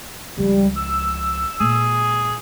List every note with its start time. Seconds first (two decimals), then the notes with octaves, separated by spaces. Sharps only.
0.37 C#2 F3 G3
0.76 E6
1.60 A#2 G#3 G#4